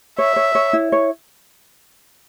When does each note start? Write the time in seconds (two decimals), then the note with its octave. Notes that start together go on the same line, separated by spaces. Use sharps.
0.18 C#5 E5
0.36 C#5
0.55 C#5
0.73 E4
0.92 C#5